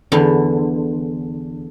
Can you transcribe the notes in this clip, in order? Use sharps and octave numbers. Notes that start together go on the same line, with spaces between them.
E2 D3